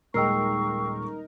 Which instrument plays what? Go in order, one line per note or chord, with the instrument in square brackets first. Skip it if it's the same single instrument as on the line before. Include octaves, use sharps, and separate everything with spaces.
[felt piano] D#1 G#3 [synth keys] D#4 A#4 [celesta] G5 E6 C7 [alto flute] C#6